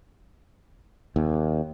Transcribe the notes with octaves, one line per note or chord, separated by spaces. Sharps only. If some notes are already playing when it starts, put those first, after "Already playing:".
D#2